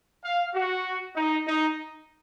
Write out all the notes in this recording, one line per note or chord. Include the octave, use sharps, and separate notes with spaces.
F5
F#4
D#4
D#4